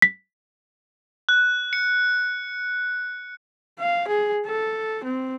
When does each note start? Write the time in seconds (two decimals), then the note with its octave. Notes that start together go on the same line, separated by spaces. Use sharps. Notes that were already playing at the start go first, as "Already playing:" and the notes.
0.02 B6
1.29 F#6
1.73 C#7
3.79 F5
4.08 G#4
4.46 A4
5.04 C4